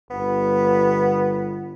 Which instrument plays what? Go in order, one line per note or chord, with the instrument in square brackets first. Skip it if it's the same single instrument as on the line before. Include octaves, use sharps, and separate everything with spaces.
[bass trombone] G1 [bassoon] B3